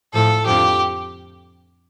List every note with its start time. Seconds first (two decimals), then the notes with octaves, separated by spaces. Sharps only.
0.13 A2 F3 A4
0.45 F2 D3 F3 G4